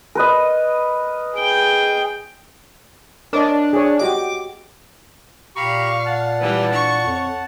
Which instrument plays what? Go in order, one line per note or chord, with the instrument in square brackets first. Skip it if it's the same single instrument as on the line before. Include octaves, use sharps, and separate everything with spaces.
[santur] A#4 B4 D#5
[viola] G#4 G5
[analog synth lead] D4 [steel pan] A#4 C#5 D#5
[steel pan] G#4 C#5
[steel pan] F#4 G4 D#5 [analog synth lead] D6
[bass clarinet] A#2 [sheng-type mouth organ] G4 A#5 B5 [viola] F5 [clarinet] C#6
[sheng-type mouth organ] F#5 A5
[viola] E3 G3 [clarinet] B4
[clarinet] D4 [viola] C#6
[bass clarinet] F2 [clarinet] C#5